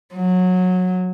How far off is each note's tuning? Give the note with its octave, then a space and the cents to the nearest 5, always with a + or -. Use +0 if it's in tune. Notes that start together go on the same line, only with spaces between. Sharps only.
F#3 -20